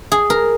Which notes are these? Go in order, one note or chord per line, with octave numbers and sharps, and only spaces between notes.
G#4
A#4